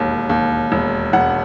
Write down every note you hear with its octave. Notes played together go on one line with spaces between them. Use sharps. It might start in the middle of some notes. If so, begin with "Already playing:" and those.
Already playing: E1 D#2
D#2
E1
E1 F#5